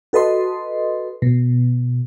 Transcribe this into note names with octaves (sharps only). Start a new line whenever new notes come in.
F#4 A4 B4 D#5 C6
B2